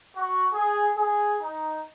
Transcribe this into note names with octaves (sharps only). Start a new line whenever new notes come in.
F#4
G#4
G#4
D#4